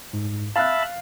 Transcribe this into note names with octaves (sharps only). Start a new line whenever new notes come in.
G#2
E5 F5 A5 B5 F6 F#6 A6